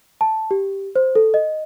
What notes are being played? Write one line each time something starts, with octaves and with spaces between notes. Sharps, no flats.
A5
G4
C5
A4
D#5